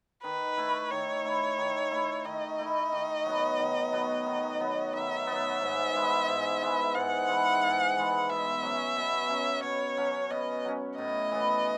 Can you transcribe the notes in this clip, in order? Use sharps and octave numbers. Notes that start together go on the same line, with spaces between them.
D#3 B4
A3 E4
D#3 C#5
A3 E4
D#3
A3 E4
D#3 D#5
A3 E4
D#3
F#3 B3
D#3
F#3 B3
D#3
F#3 B3
D#3 E5
B3
F#3
G#2
E3 G#3
G#2
E3 G#3
G#2 F#5
E3 G#3
G#2
E3 G#3
B2 E5
F#3 C#4
B2
F#3 C#4
B2 C#5
F#3 C#4
B2 D#5
F#3 C#4
A2 D#5
E3 B3